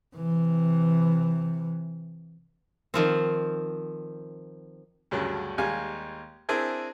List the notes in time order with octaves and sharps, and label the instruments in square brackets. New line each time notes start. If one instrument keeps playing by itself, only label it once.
[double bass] C3 E3
[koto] D#3 F3 C4
[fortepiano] D2 G2 C#3 F#3 D4
D#2 G3 G#3 F5 G#5
C4 D4 E4 G#4 A#4 G#5